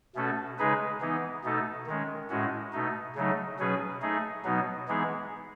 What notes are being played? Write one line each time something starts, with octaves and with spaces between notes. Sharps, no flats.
B2 A3 C#4 F#4 A4
C#3 G#3 D#4 G#4 B4
E3 B3 D#4
B2 A3 D#4 A4
D#3 G#3 C#4
A2 G#3 C#4 F#4
B2 A3 D#4
C#3 F#3 A3 D#4
B2 F#3 C#4 G#4 B4
A3 D#4 G#4
B2 F#3 B3 D#4
E3 G#3 B3 D#4 G#4